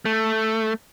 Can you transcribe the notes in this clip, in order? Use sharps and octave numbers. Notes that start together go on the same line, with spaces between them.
A3